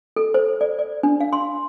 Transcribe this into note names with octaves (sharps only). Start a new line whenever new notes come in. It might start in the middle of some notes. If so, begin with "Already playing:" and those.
A4
C5
D5
D5
D4
F5
C6